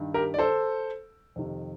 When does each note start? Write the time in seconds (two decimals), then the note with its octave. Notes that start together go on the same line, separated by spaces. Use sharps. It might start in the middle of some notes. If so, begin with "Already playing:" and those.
Already playing: G2 D#3
0.14 G4 A#4
0.34 D5
0.39 A4 C5
1.36 F2 C3 D#3